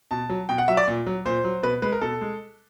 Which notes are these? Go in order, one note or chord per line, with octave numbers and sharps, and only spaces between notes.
B2 A5
F#3
B2 G5
F#5
F#3 E5
D5
A#2
F#3
A#2 C5
F#3
B2 B4
G#3 B4
A#4
B2 A4
G#3